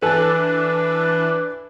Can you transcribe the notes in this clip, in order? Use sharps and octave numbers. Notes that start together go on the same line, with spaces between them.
E3 D4 A4 B4 G#5 A5